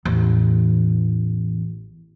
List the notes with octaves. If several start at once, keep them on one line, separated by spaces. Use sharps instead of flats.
A1 E2